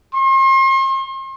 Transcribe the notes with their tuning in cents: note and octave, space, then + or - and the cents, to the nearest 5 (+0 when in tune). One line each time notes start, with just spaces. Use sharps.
C6 +40